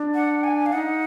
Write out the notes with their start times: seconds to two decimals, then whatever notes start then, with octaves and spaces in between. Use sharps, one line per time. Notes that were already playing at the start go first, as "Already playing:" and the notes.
Already playing: D4
0.15 F#5
0.44 G#5
0.66 F5
0.73 D#4 F#5